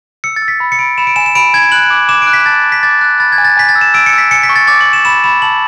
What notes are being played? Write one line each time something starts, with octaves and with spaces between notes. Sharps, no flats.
E6 C#7
A6
E6
B6
B5
C#7
B5 D7
B5 E7
D7
G#5 E7
E7
B5 D7
G#5 G#6
F#6 F#7
D6
D6 E7
D7
F#6
B6
A5 A6
D6
B6
D6 A6
F#6
B5 A6
G#6
G#5
A6
G#5 B6
A6
E6
E7
E6 D7
C#7
E6
B6
G#5 C#7
B6
C#6
A6
D6 A6
F#7
D6
E7
B5 E7
B5 E7
A5 F#7